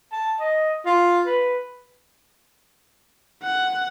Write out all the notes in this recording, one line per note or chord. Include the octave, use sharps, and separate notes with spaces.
A5
D#5
F4
B4
F#5